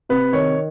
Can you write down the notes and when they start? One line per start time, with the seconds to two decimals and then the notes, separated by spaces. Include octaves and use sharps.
0.09 C3 B4
0.33 D#3 C#5